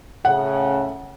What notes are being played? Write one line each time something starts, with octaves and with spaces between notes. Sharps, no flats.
A2 C#3 F#5